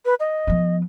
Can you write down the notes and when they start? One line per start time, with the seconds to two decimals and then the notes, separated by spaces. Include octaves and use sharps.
0.05 B4
0.20 D#5
0.47 F3 B3